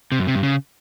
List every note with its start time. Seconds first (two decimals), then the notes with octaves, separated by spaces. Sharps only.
0.12 C3
0.19 F#2
0.27 C3
0.35 G2
0.43 C#3